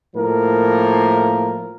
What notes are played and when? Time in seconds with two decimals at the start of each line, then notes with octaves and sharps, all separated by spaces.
0.15 A2 F3 A#3 A#4